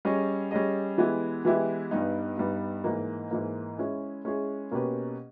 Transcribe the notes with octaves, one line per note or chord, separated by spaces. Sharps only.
G3 C#4 G#4 D#5
G3 C#4 G#4 D#5
E3 G#3 B3 E4 G4
E3 G#3 B3 E4 G4
G2 G3 B3 D#4
G2 G3 B3 D#4
G#2 E3 A#3
G#2 E3 A#3
G#3 C#4 E4 G#4
G#3 C#4 E4 G#4
B2 A#3 C#4 G4 B4